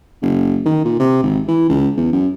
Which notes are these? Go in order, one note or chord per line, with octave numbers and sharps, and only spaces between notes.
F#1
D#3
A#2
C3
G#1
E3
C#2
E2
F#2